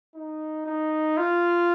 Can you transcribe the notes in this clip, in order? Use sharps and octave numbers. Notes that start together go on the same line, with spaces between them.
D#4
D#4
F4